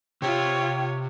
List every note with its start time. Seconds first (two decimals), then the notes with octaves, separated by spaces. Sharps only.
0.22 C3 F4 G4 C#5 G5